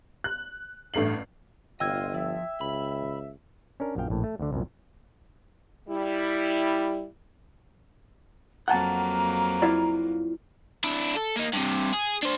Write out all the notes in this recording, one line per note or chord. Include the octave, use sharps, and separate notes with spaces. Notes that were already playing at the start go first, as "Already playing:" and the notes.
F#6
A1 G2 A3 C7 F#7
G1 A2 C3 F4 D#5 G5 E6 G#6
F3 E5
C#2 B5
C#4 D4 A#4
A#1 F#2 F3 F5 G5
A#1 A2
A3
D2 D3
C2 F#2 A#2
G3 E4
F2 F#3 A#3 F#5 G5 A5 A#5
E4 F4 D5
D4 E4
A4
A#3 D#4
G2 C3
G#4
D4 C5